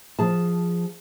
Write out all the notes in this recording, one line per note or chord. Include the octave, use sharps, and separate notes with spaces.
F3 G#4 A5